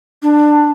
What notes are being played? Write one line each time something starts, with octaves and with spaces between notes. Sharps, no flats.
D4